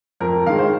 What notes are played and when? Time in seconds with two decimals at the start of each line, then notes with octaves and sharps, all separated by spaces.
0.20 F2 A#4
0.47 D#3 G#3 F5
0.59 C5